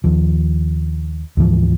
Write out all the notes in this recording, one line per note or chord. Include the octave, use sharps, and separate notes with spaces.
D#2 F3
D2 G#2 E3 F3